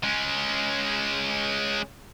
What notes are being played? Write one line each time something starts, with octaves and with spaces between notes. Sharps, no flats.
G#3 C#4